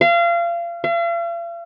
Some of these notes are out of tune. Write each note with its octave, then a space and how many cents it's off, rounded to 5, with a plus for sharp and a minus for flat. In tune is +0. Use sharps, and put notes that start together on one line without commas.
F5 -30
F5 -45